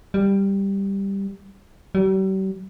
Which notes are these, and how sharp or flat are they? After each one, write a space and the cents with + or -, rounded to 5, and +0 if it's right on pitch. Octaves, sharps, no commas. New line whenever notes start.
G3 +5
G3 -45